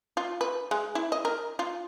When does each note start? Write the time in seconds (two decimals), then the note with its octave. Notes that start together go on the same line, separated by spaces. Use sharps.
0.17 F4
0.41 B4
0.71 G#3
0.95 E4
1.12 D#5
1.25 A#4
1.59 F4